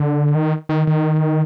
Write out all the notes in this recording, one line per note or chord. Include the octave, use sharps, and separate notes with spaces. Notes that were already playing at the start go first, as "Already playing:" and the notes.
Already playing: D3
D#3
D#3
D#3